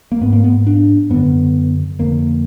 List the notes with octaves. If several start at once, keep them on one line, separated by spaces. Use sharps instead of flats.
A#3
G#2 B3
A#3
B3
D4
F#2 D3 B3
F2 D3 A#3